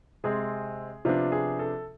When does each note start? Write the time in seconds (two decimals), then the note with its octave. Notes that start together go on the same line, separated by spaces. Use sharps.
0.24 C3 G#3 C4 G#4
1.05 C3 F3 B3 D4 F4
1.32 G#4
1.59 A4